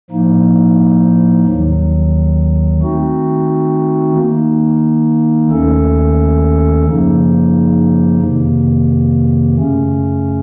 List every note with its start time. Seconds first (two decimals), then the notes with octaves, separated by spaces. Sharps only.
0.10 A2 F3 A#3 D#4
1.45 D#2 D#3 F#3
2.81 D#3 A3 C4 D#4 F#4
4.16 D#3 A#3 D#4
5.51 D#2 D#3 A3 C#4 A4
6.85 F#2 C#3 F3 A#3 D#4
8.21 F2 C3 D#3 A#3
9.56 F#2 C#3 A3 C#4